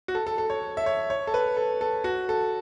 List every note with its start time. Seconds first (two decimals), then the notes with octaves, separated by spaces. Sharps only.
0.08 F#4
0.15 A4
0.27 A4
0.38 A4
0.50 C#5
0.77 E5
0.86 C#5
1.10 C#5
1.27 A4
1.34 B4
1.57 A4
1.81 A4
2.04 F#4
2.29 A4